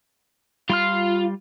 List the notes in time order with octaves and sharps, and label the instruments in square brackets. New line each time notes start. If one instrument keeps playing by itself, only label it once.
[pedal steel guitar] G3 C6 F6 [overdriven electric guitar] F4